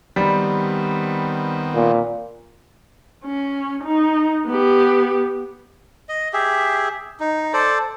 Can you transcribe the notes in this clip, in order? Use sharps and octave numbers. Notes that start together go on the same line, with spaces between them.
D#3 G3 B3 C4
A#2
C#4
D#4
B3 G4
D#5
G4 G#4 E5
D#4
A4 C5 D5